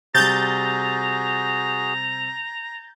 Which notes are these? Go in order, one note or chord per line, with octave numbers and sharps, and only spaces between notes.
C3 G3 F#4 G#4 A#5 G6 A6